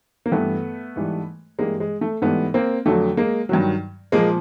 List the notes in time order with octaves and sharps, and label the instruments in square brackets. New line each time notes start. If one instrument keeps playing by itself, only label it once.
[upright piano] A#3
G2 E3 G3 A3 B3
G#2 E3 G3
G2 E3 G3 G#3 A#3
G#3
A3
G#2 E3 G3 A3 B3
A#3 C4
F2 D3 F#3 A3
G#3 A#3
G2 D#3 F#3
A#2 F3 G#3 A#3